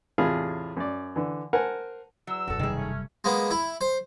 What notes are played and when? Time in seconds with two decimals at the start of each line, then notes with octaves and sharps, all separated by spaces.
0.18 E2 A2 C3 F4 G#4 F5
0.77 F#2 D5
1.16 D3 E3
1.53 A#4 C5 F#5 G#5 A5
2.27 E2 F#3 E6
2.48 E1 F#2 F#4 A4
2.59 C3 D#3 G3 G#4
2.77 A3 C#4
3.24 G#3 A#3 B3
3.51 E4
3.81 C5